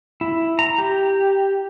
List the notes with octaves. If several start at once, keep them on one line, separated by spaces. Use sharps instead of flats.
E4
A#5
G4